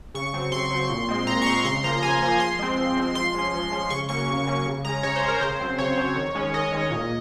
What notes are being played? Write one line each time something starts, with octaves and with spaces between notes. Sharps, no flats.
C#3 C#6
F#3 C4
C#3 C6
F#3 C4
A#2
G#3 C4
A#2 A#5
C#6
G#3 C4 C6
C#3 C6
F3 A#3 A#5
C#3 G#5
F3 A#3
F3 C6
G#3 C4
F3
G#3 C4
F3 C6
G#3 C#4
F3
G#3 C#4
C#3 C#6
F#3 A#3 C#4 C#6
C#3
F#3 A#3 C#4
C#3
G#3 C#4 A#5
C#3 C#5
C5
G#3 C#4
A#4
C#3 C5
F#3 C4
C#3 C#5
F#3 C4
D#3
G#3 C#4
D#3 D#5
G#3 C#4
A#2